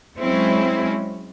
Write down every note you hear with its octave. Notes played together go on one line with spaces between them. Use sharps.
F#3 G#3 C4 C#4 E4